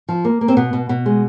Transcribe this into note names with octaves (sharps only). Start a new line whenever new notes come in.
F3
A#3
A#3
C4
B2 B3
B2
B2
G#3